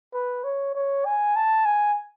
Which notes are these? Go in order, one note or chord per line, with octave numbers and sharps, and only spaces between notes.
B4
C#5
C#5
G#5
A5
G#5